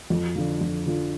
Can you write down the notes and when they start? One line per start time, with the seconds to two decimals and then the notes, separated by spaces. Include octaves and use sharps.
0.10 F2
0.36 D3 F3
0.61 F2
0.86 D3 F3